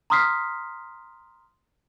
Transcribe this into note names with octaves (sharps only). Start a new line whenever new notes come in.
A#5 C6 D#6 F6 B6 C7